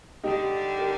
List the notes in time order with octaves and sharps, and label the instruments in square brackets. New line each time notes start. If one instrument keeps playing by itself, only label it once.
[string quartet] D3 G3 D4 [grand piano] D#4 G4
[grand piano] G4 A#4